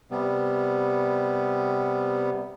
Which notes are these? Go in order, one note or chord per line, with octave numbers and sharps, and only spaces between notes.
C3 G3 B3